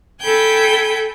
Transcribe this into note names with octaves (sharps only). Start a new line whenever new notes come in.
A4 G5 G#5 B5 G6